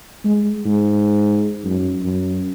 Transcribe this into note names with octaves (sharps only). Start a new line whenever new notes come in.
G#3
G#2
F#2
F#2